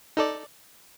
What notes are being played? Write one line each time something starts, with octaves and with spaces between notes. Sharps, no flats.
D#4 A4 D5